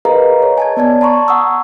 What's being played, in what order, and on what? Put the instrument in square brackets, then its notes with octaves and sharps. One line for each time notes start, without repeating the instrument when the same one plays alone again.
[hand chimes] G#4 A#4 B4 D#5 F5 A#5
C#5 D#5
G#5 A5 G#6
B3 D5 A5 G#6
A5 A#5 C6 C#6
F#5 C#6 D#6 E6